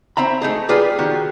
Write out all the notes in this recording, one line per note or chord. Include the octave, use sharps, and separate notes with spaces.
C4 E5 A#5 B5
A3 D#4 G#4
F4 G4 G#4 B4 D5
D#3 F#4 G4